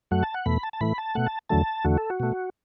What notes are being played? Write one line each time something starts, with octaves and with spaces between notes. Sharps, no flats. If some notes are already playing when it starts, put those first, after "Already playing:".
F#2 F#3 A3 F#5
A5
F#5
E2 B2 A3 B5
A5
A5
A2 E3 A3 B5
A5
B2 A3 F#5
A5
E2 D3 F#3 A3 A5
E2 D3 A3 F#4
A4
F#4
B2 A3